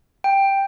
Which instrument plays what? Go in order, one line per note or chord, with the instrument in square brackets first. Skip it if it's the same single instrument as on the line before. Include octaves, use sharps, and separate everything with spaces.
[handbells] G5